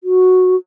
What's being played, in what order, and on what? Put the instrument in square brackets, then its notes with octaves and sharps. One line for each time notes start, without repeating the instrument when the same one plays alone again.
[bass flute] F#4